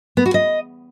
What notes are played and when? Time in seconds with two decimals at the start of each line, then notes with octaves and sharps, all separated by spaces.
0.17 B3
0.26 F#4
0.34 D#5